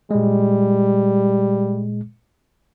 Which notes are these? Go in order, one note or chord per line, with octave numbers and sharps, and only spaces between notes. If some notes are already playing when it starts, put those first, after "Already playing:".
A#2 G3 G#3